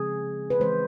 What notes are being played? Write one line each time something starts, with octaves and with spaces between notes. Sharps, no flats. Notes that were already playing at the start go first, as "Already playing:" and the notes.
Already playing: C#3 F3 G#3 C4 G#4
B4
E3 G#3 C4 C5